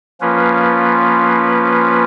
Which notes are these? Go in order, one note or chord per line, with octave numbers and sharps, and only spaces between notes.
F3 A#3 C#4 F4 B4